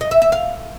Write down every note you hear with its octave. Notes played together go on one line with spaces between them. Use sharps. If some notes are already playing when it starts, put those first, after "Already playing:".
D#5
E5
E5
F5